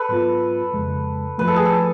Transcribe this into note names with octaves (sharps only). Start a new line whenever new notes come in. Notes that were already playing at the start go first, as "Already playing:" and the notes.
Already playing: A4 B4
G#2 F#3 B3 F4
F2 C#3 G#3
F#2 F3 A3 B4
A4
G#4
A4